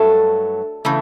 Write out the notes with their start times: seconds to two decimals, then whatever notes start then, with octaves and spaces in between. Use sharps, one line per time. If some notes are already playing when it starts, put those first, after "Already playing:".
Already playing: G2 F#3 A3 A4
0.85 C#3 E3 A3